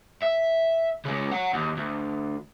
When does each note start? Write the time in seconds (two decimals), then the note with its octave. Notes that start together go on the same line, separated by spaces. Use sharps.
0.22 E5
1.05 C#3 G#3
1.32 C#5 F#5
1.54 D#2
1.77 D2